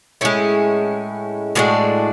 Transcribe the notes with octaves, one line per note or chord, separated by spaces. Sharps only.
A2 G#3 C#4 E4
A2 E3 G#3 D4 F#4